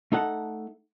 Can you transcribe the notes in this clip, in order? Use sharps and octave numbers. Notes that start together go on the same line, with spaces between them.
A3 D#4 A4 F#5